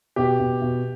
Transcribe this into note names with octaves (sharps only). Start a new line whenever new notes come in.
B2 G4
B2
B2